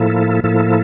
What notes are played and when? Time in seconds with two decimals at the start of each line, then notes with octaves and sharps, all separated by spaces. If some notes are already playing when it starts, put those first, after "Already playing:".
Already playing: A2 F3 A#3 E4 A4
0.44 A2 F3 A#3 E4 A4